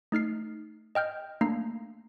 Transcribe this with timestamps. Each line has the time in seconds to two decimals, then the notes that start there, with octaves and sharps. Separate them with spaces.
0.12 A3 D#4 F6 C7
0.95 D#5 G5 F6 G6
1.41 A3 A#3 D4 A#5 C7